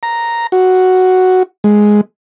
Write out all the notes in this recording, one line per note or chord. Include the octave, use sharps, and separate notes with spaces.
A#5
F#4
G#3